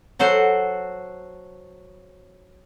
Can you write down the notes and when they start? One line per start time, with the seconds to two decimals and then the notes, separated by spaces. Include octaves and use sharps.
0.19 F#3 F#4 A4 C5